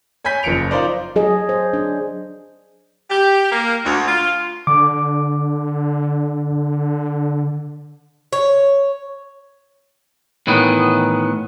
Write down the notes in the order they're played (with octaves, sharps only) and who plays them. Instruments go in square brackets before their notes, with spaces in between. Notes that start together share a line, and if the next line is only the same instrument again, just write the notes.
[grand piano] C#5 G#5 B5 G6 B6
F#1 F3 C#7 D7 F7
D#4 F4 A#4 C5 D5
[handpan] F#3 G#4 D#5
C5
D4
[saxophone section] G4
A#3
D2
F4
[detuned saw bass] D3 [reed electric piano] D6
[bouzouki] C#5
[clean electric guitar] A2 D#3 E3 B3